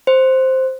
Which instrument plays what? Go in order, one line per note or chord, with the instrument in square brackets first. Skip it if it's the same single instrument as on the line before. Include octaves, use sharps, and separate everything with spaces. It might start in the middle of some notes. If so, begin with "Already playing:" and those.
[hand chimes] C5